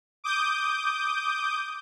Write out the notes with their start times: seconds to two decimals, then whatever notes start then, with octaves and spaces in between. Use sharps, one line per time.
0.24 D6 D#6 G6